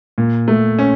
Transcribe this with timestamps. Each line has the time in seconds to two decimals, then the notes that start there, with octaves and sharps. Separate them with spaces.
0.18 A#2
0.48 A3
0.79 C#4